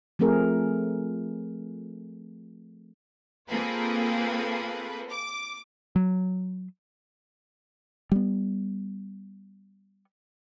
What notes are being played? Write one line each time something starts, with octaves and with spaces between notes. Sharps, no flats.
F3 A3 C4 G#4 A#4
A#3 C4 F4 G#4 A4 B4
D6
F#3
G3 B3